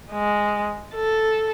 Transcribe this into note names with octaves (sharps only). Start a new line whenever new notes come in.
G#3
A4